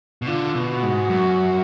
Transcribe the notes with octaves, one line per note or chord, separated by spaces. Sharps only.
B2
D3 F4
B2
F#4
G#2
F#2